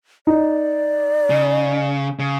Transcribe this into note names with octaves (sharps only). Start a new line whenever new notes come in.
D#4 D5
C#3
C#3